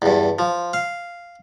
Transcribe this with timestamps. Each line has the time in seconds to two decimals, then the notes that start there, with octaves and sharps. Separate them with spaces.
0.02 E2 G2
0.39 F3
0.73 F5